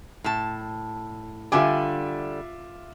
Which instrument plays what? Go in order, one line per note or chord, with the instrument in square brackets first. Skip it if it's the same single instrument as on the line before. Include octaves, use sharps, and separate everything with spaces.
[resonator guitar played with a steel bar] A2 A5
[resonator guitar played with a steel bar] D3 G3 G#5 [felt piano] F4 E5 D6